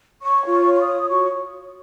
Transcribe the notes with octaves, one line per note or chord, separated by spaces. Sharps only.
C#5 C#6
F4
C#6
C#5
C#6
D#6
C#5
F#4 C#6